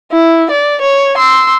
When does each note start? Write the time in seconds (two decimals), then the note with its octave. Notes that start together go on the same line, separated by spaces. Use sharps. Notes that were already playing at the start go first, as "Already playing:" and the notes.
0.12 E4
0.50 D5
0.81 C#5
1.17 C6 E6